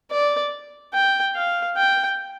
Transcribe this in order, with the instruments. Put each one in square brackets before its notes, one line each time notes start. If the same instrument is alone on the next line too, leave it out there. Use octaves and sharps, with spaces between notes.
[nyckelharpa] D5
G5
F5
G5